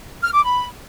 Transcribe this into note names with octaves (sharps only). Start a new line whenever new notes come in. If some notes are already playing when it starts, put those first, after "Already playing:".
F6
D6
B5